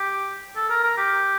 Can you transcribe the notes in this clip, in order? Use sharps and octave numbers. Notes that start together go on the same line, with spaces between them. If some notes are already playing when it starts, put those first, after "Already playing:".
Already playing: G4
A4
A#4
A#4
G4